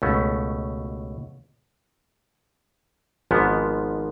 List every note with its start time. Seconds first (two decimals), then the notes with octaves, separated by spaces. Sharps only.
0.02 C#2 B2 A3 C#4
3.31 G#1 G#2 F3 B3